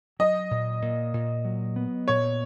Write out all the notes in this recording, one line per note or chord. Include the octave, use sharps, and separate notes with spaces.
F#3 D#5
A#2
A#2
A#2
F#3
B3
A#2 C#5